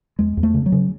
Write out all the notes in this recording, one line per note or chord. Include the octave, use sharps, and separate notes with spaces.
E2 G#3
E2
A3
C#3
F#3
C#3